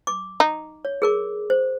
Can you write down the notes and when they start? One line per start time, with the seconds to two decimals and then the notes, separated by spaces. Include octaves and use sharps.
0.07 D6
0.40 D#4
0.85 C#5
1.02 G#4 A#4 D6
1.50 C5